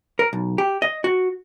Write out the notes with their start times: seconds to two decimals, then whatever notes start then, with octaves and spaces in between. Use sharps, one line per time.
0.19 A#4
0.33 B1
0.58 G4
0.82 D#5
1.04 F#4